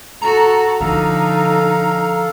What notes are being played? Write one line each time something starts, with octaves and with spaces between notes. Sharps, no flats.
F#4 A4 A#5
D3 F3 D#4 A4 F5